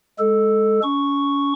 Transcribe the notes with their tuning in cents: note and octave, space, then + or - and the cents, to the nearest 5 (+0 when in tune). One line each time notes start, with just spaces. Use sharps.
G#3 +0 A4 +0
C#4 +35 C#6 +0